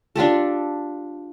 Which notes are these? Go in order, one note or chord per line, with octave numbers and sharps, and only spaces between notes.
D4 F4 G4 A4